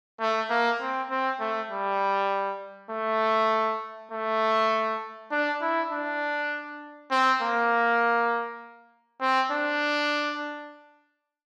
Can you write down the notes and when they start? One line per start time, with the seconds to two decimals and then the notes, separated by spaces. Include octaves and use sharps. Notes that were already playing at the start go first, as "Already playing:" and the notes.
0.20 A3
0.50 A#3
0.81 C4
1.11 C4
1.40 A3
1.70 G3
2.91 A3
4.12 A3
5.32 D4
5.61 E4
5.91 D4
7.11 C4
7.42 A#3
9.22 C4
9.52 D4